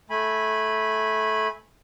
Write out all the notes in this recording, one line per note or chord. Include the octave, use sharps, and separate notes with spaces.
A3 G#5 B5